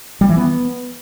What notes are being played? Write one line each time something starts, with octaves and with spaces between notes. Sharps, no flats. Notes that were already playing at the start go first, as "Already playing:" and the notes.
G3
E3
B3